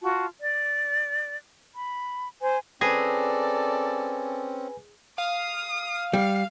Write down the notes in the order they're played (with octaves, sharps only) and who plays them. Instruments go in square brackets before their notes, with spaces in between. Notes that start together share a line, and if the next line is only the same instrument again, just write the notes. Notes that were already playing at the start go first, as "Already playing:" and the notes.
[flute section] F4 F#4 A5
D5
B5
C5 G#5
[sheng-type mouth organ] C4 C#4 [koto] G#4 [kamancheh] A4 D5 [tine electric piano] B4 G#5 A#6
[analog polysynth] F5 [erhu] D#6
[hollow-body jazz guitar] G3 [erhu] F5